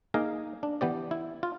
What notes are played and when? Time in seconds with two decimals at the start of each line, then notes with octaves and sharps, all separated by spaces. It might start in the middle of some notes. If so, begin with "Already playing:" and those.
0.14 A#3 D#4 G#4 F5 A#5
0.63 D4
0.81 E3 B3 G4 D5
1.11 E4
1.43 F4